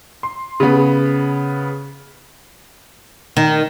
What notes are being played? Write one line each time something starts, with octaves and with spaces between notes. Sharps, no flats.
C6
C#3 B3
D#3